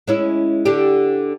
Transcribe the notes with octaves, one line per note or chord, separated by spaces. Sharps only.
G#3 C#4 E4
D3 D4 G4